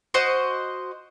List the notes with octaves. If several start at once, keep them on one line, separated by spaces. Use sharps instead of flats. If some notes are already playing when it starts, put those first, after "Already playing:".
F#4 C5 D#5